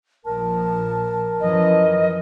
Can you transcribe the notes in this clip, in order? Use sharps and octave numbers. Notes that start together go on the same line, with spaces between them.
A#1 F3 A#4 A5
F#2 E3 F3 D#5